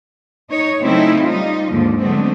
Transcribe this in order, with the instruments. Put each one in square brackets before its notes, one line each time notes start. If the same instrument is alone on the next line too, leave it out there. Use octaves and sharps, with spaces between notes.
[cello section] D#4 C#5
C#3 F#3 A3 C4 D#4 E4
G3 D#4 F4
D#2 G#2 D3 F3
D3 F#3 G#3 A3 B3 C4